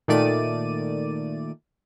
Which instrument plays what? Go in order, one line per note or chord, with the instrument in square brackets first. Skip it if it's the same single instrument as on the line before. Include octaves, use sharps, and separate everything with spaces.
[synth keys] A#2 D#3 A3 D5 D#7